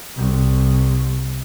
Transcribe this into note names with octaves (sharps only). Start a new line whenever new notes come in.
C2